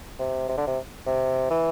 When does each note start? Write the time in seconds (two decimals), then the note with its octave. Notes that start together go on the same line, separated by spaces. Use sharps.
0.19 C3
0.49 C3
0.57 D3
0.67 C3
1.07 C3
1.50 E3